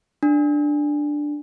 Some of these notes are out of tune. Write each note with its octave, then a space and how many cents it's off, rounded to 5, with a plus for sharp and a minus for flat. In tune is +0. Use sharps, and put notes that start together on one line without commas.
D4 +5